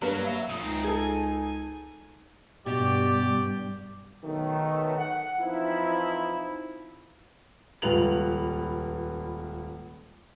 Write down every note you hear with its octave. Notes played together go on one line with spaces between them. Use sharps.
G2 F#3 A#3 B4
E5 F5
F3 A3 D#6
C#2 G#3 C4 D#4
G#4 A4 G#5
G2 B2 G4 D5
B1 D#3 A3
F#5
E3 F3 C4 D#4 E4
D#1 C#2 F4 B4 F7 F#7